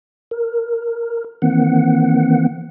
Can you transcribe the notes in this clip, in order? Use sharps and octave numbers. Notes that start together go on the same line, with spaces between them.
A#4
D#3 E3 A#3 C4 F#5